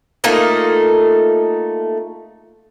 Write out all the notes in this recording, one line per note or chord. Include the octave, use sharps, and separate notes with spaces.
A3 A#3 D#4 F4